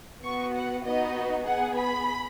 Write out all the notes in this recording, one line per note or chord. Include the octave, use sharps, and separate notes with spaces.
B3 F#4 C#6
F#5
B3 D#4 F#4 D#5
B3 G#4 F#5
B5